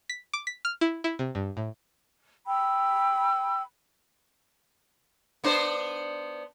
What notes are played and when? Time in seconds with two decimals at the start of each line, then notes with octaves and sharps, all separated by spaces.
0.10 B6
0.33 D6
0.47 B6
0.65 F6
0.81 E4
1.04 E4
1.19 C3
1.35 G2
1.57 A2
2.46 G5 B5 E6
5.44 B3 D4 C5